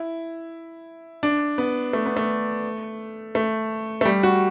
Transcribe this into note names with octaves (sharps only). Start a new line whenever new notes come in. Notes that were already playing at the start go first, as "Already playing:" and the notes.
Already playing: E4
D4
B3
A3
B3
A3
A3
A3
G3
F#4